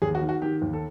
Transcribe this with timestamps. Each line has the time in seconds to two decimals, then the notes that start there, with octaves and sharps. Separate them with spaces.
0.02 D#2 G#4
0.15 F#4
0.21 D#3
0.29 F#4
0.42 D#3 G4
0.62 D#2
0.73 A4